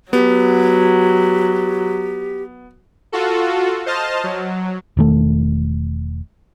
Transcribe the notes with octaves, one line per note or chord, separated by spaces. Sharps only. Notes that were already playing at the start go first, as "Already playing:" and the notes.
F#3 B3 G4
F4 F#4 A4
C5 D#5 A5 F6
F#3
E1 D#3 A3